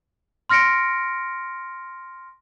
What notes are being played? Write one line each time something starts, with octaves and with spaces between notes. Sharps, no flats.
C6 F6 A#6 C#7 D7